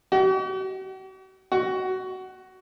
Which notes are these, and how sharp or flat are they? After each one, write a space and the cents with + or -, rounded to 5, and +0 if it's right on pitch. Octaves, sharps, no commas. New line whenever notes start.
F#4 +45
F#4 +15